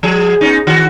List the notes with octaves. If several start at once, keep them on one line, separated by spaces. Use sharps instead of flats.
F3 G#4
B3 C#4 D#4
D#3 F#4